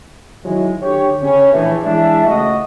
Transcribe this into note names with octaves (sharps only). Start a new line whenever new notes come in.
D#3 F#3 G#3 E4
D3 G4 C#5
C#3 C#4
A#1 A2 E3
E3 G#3 D4 G#4 E5
C#2 A3 F#4 D#5